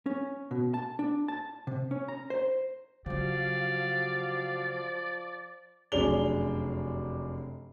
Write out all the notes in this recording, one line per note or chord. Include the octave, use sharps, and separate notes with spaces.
C#4
B2
A5
D4
A5
C3
C#4
A#5
C5
C#3 F3 F#3 F#4 G4 D5 F5
F1 F#2 D4 G#4 F7 G7